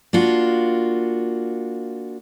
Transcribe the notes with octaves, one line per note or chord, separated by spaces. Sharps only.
A#3 D4 F4 F#4